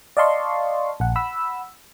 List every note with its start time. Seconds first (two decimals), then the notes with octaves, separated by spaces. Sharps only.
0.17 D5 D#5 F5 A5 C6 C#6
1.00 A#1 F#5
1.15 F#5 B5 E6